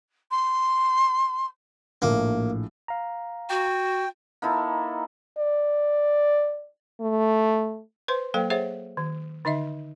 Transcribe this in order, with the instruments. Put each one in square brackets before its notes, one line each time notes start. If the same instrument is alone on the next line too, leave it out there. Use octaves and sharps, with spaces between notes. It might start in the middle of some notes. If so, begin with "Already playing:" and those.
[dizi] C6
[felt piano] A#1 A2 [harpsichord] A#3
[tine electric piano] F5 A#5
[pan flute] F#4 [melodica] G5
[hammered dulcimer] A#3 D#4 E4 A4
[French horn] D5
A3
[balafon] B4 C5 C6
F#3 A#3 A4 C5 F5 G5
G#4 C5 C#5 E5 F#5
D#3
D3 D#4 D#5 E5